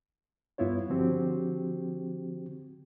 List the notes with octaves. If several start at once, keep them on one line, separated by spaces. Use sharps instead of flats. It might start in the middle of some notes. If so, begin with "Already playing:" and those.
G2 B3 E4 F4 C#5
D3 F3 C4 F#4 G4